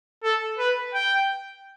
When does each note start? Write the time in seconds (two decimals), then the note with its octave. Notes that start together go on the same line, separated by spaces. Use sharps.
0.23 A4
0.59 B4
0.94 G5